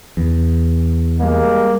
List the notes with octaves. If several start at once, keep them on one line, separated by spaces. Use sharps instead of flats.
E2
G3 G#3 A#3